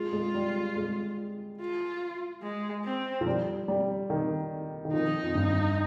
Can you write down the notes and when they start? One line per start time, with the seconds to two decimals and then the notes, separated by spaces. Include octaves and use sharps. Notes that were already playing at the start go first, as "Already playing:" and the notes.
Already playing: G#3 F4
0.13 G#3
0.34 G3
0.76 G#3
1.60 F4
2.42 G#3
2.85 C4
3.21 F3
3.27 G3
3.68 G3
4.10 D#3
4.85 D#3
4.93 F3 D#4
5.23 F2
5.35 G2